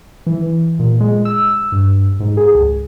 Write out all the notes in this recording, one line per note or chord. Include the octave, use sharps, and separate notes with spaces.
E3
A#2
G#3
E6
G2
G#2
G#4
C#2